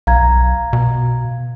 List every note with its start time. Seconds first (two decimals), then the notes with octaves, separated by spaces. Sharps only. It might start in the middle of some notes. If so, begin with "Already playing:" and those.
0.07 B1 F5 A#5 G#6
0.73 B2